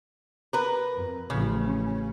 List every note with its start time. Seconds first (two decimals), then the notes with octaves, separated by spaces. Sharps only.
0.53 A#4 B4
0.95 F2
1.30 A1 C#3 F3
1.62 C#4